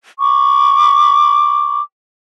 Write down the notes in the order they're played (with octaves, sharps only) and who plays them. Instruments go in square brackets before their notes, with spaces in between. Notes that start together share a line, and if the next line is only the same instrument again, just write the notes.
[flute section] B5 C#6 D6